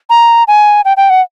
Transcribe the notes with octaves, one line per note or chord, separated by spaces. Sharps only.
A#5
G#5
G5
G5
F#5